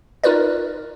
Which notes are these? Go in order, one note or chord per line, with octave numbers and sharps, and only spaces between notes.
D#4 F4 A#4 B4 D5